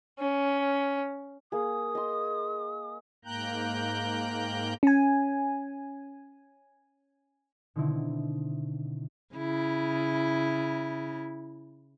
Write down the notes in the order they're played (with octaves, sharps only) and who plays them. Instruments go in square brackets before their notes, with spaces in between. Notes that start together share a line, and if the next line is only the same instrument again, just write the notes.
[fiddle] C#4
[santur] A#3 G#4 [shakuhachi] D#6
[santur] D#5 C6
[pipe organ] G#2 A#3 G5 A#5 F#6 G6
[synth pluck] C#4 G#5
[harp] B2 D3 D#3 C4 D#4 E4
[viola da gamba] C#3 E4